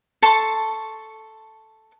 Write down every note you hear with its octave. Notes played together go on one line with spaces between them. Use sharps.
A4 A5 C6 C#6